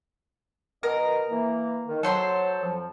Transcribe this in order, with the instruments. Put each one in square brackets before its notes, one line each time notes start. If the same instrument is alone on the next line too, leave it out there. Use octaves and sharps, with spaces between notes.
[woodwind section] B2 D#5 [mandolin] A#4
[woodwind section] E3 A#3
D#3
[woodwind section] F#3 [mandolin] A4 C5 C6
[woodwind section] F2 F3